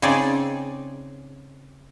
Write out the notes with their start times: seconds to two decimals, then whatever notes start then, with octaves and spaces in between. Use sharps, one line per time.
0.02 C#3 C4 D#4 G#4 D5